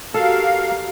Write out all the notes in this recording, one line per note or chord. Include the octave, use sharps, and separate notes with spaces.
F#4 G4 A4 A#4 F5